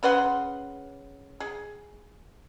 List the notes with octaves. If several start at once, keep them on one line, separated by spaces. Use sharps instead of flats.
C#3 B4 F#5 C6
G#4